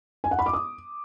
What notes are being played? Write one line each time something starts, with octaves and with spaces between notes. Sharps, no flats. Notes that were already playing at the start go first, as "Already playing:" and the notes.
G#5
F#5
B5
D6
D#6